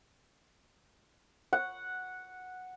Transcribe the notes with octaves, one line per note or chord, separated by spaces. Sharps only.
F#5